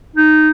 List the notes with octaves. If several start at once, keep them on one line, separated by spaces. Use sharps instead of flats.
D#4